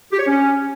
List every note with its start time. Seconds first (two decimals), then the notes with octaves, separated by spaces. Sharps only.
0.12 G4
0.19 C#5
0.27 C#4